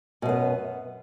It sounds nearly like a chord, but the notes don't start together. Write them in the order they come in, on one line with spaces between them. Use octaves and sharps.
B2 F#2 B3